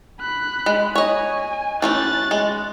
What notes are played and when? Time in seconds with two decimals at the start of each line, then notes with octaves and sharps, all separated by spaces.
0.21 B5 F#6
0.66 G#3
0.95 C#5 D#5 G#5
1.82 E3 A3 C#4 F#6 A6
2.31 G#3